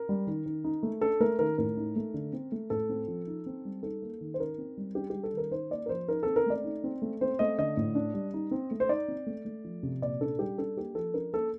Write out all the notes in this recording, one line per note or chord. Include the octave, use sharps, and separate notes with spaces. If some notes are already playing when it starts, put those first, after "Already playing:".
Already playing: A#4
G3
D#3
D#3
D#4
A3
D4 A4
A3 A#4
D#3 A#4
A2 A#4
D#4
A3
D3
C4
A3
A2 A4
C4
F3
D#4
C4
G3
D#4 A4
A#3
D#3
C5
D#4 A#4
C4
G3
D4 G4
G3 G4
A4
D#3 A#4
D#4 C5
A#3 D5
A#4
F3 C5
D#4 A#4
C4 A4
A#4
A3 D5
D#4
C4
A3
C4 C5
A3 D#5
D3 D#5
A2
D4
G3
D#4
C4
A3
C5
D#4 D5
C4
A3
A3
F3
C3
A#2 D5
D4 A4
G3 G4
D4 A4
A#3 G4
F3 A4
D4 A#4
A#3 A4